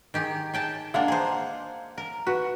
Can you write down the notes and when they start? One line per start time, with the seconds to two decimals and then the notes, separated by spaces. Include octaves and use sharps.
0.14 D#3 G4 G#4
0.54 G#4 G5 A5
0.94 G#3 A#3 D4 F5 F#5
1.08 G#4 C5
1.98 A#4
2.27 F#4 B4